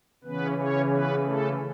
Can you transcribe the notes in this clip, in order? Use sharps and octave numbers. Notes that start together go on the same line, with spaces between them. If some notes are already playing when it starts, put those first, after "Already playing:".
C#3 E3 B3 C#4 B4
C#4 C#5
B3 B4
A3 A4